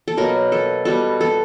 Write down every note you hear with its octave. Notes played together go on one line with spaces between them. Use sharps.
A4
B2 F#3 A#3 A#4
A4
B2 G3 B3 A4
A4